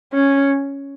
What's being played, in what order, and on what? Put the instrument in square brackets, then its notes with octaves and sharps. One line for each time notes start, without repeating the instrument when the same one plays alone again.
[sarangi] C#4